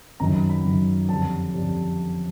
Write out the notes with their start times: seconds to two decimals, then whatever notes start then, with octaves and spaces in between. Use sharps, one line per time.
0.20 F#2 D#3 F#3 A#5
0.35 B5
0.50 B5
0.64 F#2 D#3 F#3
1.09 F2 D3 G3 A5
1.54 F2 D3 G3